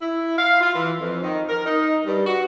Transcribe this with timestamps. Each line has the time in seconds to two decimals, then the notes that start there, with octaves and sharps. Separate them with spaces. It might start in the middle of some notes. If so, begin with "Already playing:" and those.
0.02 E4
0.38 F5
0.61 F4
0.75 E3
1.00 F2
1.23 D#3
1.49 A#4
1.66 D#4
2.06 G2
2.26 F#4